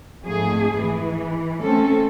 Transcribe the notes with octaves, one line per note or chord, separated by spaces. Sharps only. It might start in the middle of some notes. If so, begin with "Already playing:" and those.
F2 G#2 A3 G#4
E3
A3 C4 C#4 A4